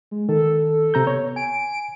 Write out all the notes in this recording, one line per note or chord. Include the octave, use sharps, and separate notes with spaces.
G#3
D#3 A4
C3 A#5 G6
B3 C#5
G#5 D7